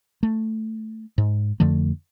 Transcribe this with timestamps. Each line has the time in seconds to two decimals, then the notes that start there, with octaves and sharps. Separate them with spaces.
0.23 A3
1.18 G#2
1.60 F2 D3 F3 A3